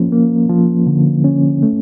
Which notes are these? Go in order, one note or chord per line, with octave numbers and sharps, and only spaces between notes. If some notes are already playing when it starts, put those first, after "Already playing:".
Already playing: F3 A#3 C#4
A#3
F3
D3
C#4
A3